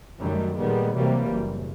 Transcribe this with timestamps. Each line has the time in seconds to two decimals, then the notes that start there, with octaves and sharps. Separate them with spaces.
0.19 F#2 D#3 F#3 G3 A3
0.56 A#2 D#3 G3 G#3 B3
0.95 C3 E3 F#3 G3 A#3 C4
1.30 F#1